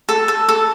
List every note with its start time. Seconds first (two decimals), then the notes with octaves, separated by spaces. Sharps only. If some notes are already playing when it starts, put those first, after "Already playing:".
0.09 A4
0.28 A4
0.49 A4